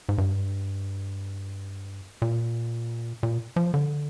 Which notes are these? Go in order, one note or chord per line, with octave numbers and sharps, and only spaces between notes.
G#2
G2
A#2
A#2
F3
D3